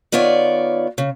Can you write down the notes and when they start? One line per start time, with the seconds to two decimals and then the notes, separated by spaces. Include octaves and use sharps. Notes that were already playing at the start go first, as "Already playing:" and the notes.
0.12 D#3 B3 F4 C#5 D5
0.98 C#3